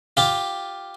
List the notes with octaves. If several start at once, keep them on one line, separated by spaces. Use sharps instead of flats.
F4 G4